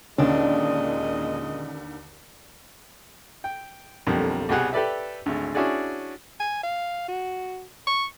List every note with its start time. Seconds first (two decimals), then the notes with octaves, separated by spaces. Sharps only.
0.18 D#2 A#2 D3 G#3 C#4 D4 D#5
3.44 G5
4.07 B1 F2 D3 G3 A#3
4.49 C2 B2 G3 G4 G#4 F#5
4.73 G4 A4 B4 D5 E5
5.26 G#1 D2
5.55 C#4 D4 E4 F#4 G#4 D5
6.40 G#5
6.63 F5
7.08 F#4
7.87 C#6